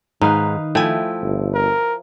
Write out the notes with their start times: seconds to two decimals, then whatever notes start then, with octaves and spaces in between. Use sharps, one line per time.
0.22 G#2 D#3 D#4 B4 F5
0.75 F3 A3 E4 G5 G#5
1.22 G1
1.54 A#4